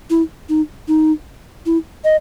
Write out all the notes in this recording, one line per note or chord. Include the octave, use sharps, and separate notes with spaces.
E4
D#4
D#4
E4
D#5